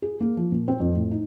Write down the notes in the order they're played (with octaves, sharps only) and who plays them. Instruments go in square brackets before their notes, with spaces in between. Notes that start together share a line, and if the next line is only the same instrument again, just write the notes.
[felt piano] G#4
A#3
F3
A#2
C4
F2
A2
D#4